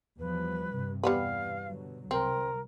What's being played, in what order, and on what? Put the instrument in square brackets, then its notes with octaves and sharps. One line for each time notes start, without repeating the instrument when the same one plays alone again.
[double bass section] E2 F3 G3 [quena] B4
[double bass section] G2 C3
[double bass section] E2 G2 C3 [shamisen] G3 B3 B4 [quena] F5
[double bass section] B2 D3 F#3
[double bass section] C2 [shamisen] C4 [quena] A#4